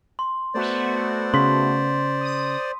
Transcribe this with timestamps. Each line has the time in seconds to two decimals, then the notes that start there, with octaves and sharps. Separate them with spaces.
0.19 C6
0.54 A3 B3 F#4 C5 D5
1.34 C#3 C6 B6
2.21 D#6